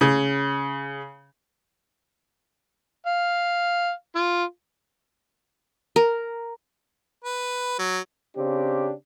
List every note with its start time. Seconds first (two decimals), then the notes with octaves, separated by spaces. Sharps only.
0.01 C#3
3.06 F5
4.16 F4
5.96 A#4
7.24 B4
7.79 F#3
8.36 C#3 C4 D4 G4